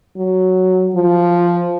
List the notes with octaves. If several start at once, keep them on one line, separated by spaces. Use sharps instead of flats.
F#3
F3